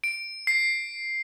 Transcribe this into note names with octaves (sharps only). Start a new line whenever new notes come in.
D7
C7